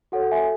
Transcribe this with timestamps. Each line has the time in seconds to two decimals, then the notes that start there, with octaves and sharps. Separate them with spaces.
0.12 F#4 A4 C#5 F#5
0.31 E5 G#5